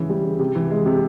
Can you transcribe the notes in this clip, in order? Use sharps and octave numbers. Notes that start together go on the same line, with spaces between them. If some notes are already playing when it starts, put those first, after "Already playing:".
Already playing: C#3 E3
G3
C#3
C3
E3
G#3
C3